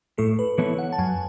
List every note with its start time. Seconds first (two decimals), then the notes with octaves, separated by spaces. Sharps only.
0.18 A2 A4
0.39 B4
0.58 E3 B3 E4 A4 C#5
0.79 F#5
0.93 A5
0.98 F#2 G#5